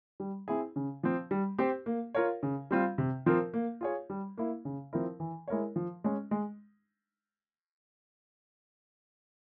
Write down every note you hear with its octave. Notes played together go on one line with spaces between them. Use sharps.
G3
C4 E4 G#4
C#3
F3 C4
G3
C4 G4 C5
A#3
F4 A#4 C#5
C#3
G3 C4 F4
C3
F3 C4 F4 A#4
A#3
F4 G#4 C#5
G3
A#3 E4
C#3
F3 C4 E4 A#4
E3
G#3 E4 A#4 C#5
F3
G#3 C#4
G#3